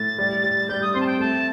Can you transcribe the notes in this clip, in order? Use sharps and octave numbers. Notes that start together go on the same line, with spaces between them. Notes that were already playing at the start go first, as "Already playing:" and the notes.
Already playing: A2 A6
G3
G3
G3 G6
D#6
C4 C6
A5
G5
A3 A5